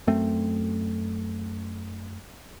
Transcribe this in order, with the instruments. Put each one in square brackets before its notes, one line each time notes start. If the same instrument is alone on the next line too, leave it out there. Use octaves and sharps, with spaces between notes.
[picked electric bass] F#2 A3 C4